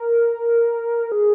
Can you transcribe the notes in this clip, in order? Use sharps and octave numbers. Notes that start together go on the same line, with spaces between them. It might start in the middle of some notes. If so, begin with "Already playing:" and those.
Already playing: A#4
G#4